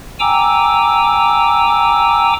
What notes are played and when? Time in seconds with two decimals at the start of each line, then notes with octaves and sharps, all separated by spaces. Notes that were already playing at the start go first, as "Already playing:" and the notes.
0.20 G5 G#5 A#5 D6 E6